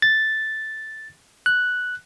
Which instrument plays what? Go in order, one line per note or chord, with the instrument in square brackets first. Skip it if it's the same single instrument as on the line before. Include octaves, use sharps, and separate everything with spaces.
[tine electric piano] A6
F#6